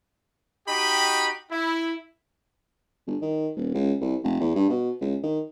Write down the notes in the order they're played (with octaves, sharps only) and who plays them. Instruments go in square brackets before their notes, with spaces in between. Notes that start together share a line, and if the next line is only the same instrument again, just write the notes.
[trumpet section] D#4 F#4 G4 D#5 G5 B5
E4
[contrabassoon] G1
D#3
D#1
C#2
C2
F1
E2
G2
B2
C#2
D#3